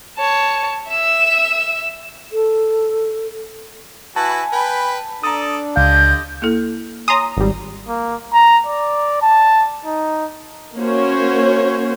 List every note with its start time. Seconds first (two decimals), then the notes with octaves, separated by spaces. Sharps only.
0.18 C#5 A5
0.89 E5 E6
2.33 A4
4.16 E4 F#4 B4 G#5 A5
4.53 B4 G5 B5
5.23 D4 A4 D5 A#5 D#6
5.76 C#2 D3 G4 D#5 F5 G6
6.42 A#3 E4 A4
7.08 C#5 G#5 A#5 C6 D#6
7.37 G#1 G3
7.88 A#3
8.33 A#5
8.66 D5
9.22 A5
9.85 D#4
10.78 A#3 C#4 F#4 C5 C#5